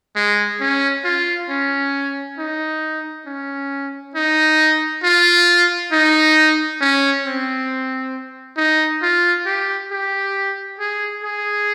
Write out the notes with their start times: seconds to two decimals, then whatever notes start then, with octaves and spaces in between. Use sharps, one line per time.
0.16 G#3
0.61 C#4
1.04 F4
1.49 C#4
2.38 D#4
3.26 C#4
4.15 D#4
5.03 F4
5.92 D#4
6.81 C#4
7.24 C4
8.57 D#4
9.02 F4
9.46 G4
9.91 G4
10.80 G#4
11.23 G#4